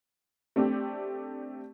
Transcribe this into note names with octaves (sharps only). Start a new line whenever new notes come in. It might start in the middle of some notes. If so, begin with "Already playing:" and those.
A3 C4 D4 G4